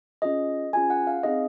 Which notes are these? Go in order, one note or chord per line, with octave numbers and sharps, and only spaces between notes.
C#4 F4 G#4 D#5
C#4 F4 G#4 G#5
F#5
F5
C4 D#4 G#4 D#5